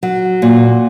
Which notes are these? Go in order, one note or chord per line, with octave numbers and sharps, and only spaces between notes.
F#3
A#2